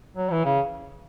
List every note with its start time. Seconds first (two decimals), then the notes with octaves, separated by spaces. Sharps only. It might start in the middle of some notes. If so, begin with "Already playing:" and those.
0.16 F#3
0.31 E3
0.45 C#3